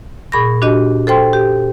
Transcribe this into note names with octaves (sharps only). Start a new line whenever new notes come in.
A#2 G#4 B5 C#6 A#6
D4 F#4 G4 D#5
A4 C5 G5 C6
G4